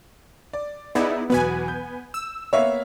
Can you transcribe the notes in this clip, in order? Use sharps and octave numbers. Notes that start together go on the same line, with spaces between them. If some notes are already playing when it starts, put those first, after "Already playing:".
D5
B3 D#4 E4 G#4 D5
E2 B2 F#3 B3 B4 G#5
G6
E6
A#3 B3 C#5 E5 F5